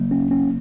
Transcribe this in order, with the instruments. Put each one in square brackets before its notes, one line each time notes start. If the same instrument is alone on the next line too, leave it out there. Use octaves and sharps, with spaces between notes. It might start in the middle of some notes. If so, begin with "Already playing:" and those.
Already playing: [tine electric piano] C#3 F#3 A#3
C#4
C#4